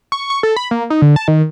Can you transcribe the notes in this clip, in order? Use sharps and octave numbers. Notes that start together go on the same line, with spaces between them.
C#6
C#6
A4
B5
A#3
D#4
D3
A5
D#3